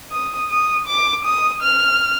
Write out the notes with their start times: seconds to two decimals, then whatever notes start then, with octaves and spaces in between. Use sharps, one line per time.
0.12 D#6
0.50 D#6
0.87 D6
1.25 D#6
1.63 F6